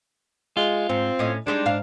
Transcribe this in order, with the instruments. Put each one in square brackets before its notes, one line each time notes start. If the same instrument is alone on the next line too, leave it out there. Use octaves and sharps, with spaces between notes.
[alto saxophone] G#3 [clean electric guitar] F4
[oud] G#2 [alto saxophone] C4
[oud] A2 C#4 D#5
[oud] G3 G#3 D#4 [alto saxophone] D4
[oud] G#2 F5